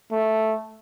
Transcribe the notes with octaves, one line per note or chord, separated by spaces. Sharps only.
A3